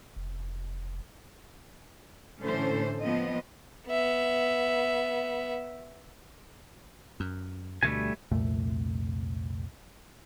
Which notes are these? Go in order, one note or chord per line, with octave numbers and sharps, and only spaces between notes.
F1
A2 D3 E3 C#4 A4 C5
F3 B3 C4 D#5
B3 E5
F#2
D2 B2 G3 A3 G#5
C2 F2 A#2 A3